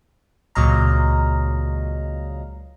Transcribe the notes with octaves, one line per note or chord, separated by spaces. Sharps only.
C#2 A#2 F#3 D#5 F5 A#5